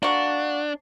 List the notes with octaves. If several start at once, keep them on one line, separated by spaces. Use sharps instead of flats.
A#3 D4 F#4